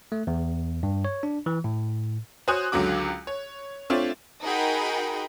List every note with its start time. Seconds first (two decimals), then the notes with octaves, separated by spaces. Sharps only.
0.12 A3
0.27 E2
0.83 G2
1.05 C#5
1.23 D4
1.46 E3
1.64 A2
2.48 F#4 C5 C#5 G#5 D#6 F#6
2.72 C#2 D3 F#3 F#4 D6
3.27 C#5
3.90 A3 C4 D4 F4 C#5 E5
4.43 D#4 F#4 G#4 A#4 G5 B5